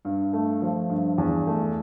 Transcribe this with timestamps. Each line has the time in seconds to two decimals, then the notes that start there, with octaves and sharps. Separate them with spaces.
0.05 G2
0.33 A3
0.62 F3
0.90 G2
1.18 E2
1.47 A3